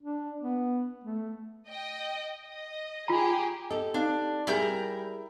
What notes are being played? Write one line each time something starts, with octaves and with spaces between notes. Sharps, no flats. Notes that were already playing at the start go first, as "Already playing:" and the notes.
D4
B3
A3
D#5 G5
D#5
F4 G4 G#4 A#5
G4 A4 D#5
C4 D4 D#4 F5
G3 E4 G4 G#4 A#4 G6